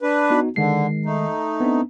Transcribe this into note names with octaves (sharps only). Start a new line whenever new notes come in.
D4 B4
B3 D#4 F#4
D3 D#3 G#3 C7
A3 D#4
B3 C4 D4